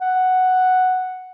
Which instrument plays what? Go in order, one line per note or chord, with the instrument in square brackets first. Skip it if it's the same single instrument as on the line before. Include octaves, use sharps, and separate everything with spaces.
[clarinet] F#5